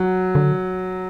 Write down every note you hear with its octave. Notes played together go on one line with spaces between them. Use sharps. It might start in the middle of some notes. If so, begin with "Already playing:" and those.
Already playing: F#3
D3